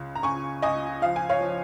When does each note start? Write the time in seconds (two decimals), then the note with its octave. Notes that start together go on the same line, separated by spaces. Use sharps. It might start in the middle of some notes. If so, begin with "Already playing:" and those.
Already playing: C#2 C#3
0.15 A#5
0.23 C#3 G#5 C#6
0.62 C#2 D#5 G#5
1.02 F3 F5
1.16 G#5
1.29 C#5 F5
1.41 F3